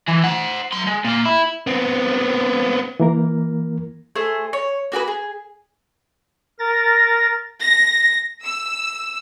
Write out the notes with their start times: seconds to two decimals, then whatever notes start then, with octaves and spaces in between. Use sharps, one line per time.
0.08 E3
0.24 C5 F#5
0.72 F#3 C6
0.87 G#3
1.05 A#2 A#3
1.25 E4
1.67 B3 C4
3.00 E3 A#3 A#4
4.15 A3 G#4 C5
4.53 C#5
4.92 A#3 F#4 G#4 B4
5.08 G#4
6.59 A#4 A6 A#6
7.61 A#6
8.43 E6